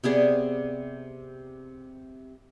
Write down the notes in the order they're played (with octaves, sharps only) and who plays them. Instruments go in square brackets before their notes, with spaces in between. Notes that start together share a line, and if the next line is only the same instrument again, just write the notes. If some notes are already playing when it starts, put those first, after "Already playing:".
[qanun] C3 B3 G#4 D5